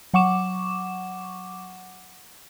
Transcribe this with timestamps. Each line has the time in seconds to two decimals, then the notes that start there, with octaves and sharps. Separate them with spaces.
0.14 F#3 F#5 C#6 D6 E7